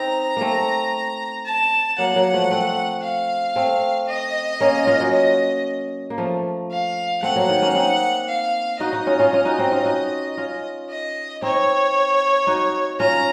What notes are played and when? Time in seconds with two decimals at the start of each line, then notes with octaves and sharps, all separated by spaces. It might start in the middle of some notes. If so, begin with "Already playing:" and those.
Already playing: C4 D#4 A#5
0.37 A3 A#3 C4
1.46 A5
1.98 F#3 A#3 F#5
2.16 F#3 A#3
2.33 F3 A3
2.51 A3 C4
3.03 F5
3.56 A3 C4
4.08 D#5
4.60 A#3 C#4
4.87 C#4 F4
5.00 F#3
5.13 D#5
6.10 A#3
6.18 F3 A3
6.71 F5
7.22 A3 C4 F#5
7.36 F#3 A#3
7.49 D#3
7.62 A#3 C#4
7.75 C4 D#4
8.28 F5
8.80 D#4 F#4 D#5
8.93 D#4 F#4
9.07 C#4 F4
9.19 C#4 F4
9.33 C#4 F4
9.45 D#4 F#4
9.58 C4 D#4
9.72 C#4 F4
9.85 D#4 F#4
10.37 C#4 F4
10.89 D#5
11.42 C4 D#4 C#5
12.47 D#4 F#4
13.00 C#4 F4 A#5